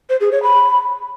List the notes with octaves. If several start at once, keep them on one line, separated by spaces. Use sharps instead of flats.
C5
G#4
C#5
B5